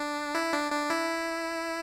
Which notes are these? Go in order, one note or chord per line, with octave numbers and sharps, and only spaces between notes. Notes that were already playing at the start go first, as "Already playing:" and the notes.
Already playing: D4
E4
D4
D4
E4